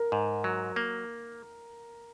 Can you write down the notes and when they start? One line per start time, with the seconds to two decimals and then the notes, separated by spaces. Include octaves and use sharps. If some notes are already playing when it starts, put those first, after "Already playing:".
Already playing: A#4
0.12 G#2
0.44 F#3
0.76 A#3